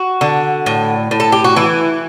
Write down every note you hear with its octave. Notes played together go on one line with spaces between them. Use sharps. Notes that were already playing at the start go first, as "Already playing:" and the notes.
Already playing: F#4
D3
A2
A2
A4
G4
F#4
E3 E4